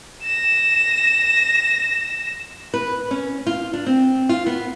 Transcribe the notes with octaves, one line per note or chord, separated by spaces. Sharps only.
A#6 E7
B4
C#4
F4
D4
C4
F4
B3